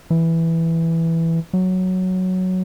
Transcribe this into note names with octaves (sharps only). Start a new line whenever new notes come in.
E3
F#3